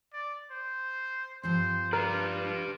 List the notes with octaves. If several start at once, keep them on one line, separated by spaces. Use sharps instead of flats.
D5
C5
G2 F3 C4 C5
F4 G4 A#4 B4 D5